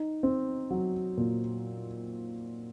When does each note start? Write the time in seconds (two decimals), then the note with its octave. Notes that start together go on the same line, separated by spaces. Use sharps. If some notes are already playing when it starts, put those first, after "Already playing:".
Already playing: D#4
0.23 C4
0.70 F#3
1.17 A#2